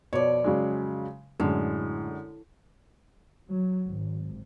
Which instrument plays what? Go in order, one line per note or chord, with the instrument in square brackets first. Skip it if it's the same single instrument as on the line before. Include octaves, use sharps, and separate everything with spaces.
[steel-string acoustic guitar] F2 D5 [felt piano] B2 C#5
[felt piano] C#3 F#3 G#3
[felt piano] F#2 D3 G#3 [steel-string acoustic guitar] A2
[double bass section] F#3
G#1